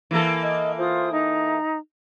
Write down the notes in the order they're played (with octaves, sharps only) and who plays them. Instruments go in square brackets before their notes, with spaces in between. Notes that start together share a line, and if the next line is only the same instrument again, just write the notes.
[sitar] E3 A#3 A4
[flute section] D#5
F4 C5 D#6
D#4 A#5